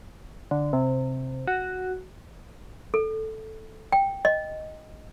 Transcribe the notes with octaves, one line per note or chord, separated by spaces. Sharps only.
D3
C3
F#4
A4
G5
D#5